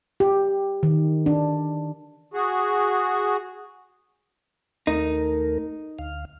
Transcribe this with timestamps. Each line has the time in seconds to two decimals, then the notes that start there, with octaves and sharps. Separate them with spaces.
0.20 G4
0.83 D#3
1.26 D4
2.34 F#4 G#4
4.87 D#2 A3 D#4 A#4
5.99 D2 F5